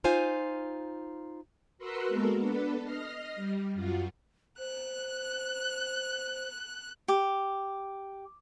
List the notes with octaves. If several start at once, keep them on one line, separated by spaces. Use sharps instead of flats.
D#4 F4 C5 F5 G#5
F#4 A#4 B4 F#5 C6 E6
G#3 A#3 B3 F#4 A4 A#4
B3 D4 A4 B4
D#5 F6 A#6 C7
G3
F#2 F4 F#4
C5 F#6
G4